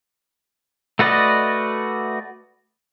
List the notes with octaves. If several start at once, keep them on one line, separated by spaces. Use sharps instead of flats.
A3 F#4 B4 D5 D#5